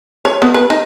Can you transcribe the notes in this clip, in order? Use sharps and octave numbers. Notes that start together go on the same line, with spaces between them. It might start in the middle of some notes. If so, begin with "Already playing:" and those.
C#5
B3
B4
D#4